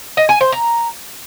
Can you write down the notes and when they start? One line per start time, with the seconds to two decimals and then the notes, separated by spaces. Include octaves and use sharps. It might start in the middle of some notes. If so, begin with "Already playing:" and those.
0.17 D#5
0.29 G#5
0.41 C5
0.52 A#5